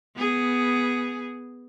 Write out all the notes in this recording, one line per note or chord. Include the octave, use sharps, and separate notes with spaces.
B3 G#4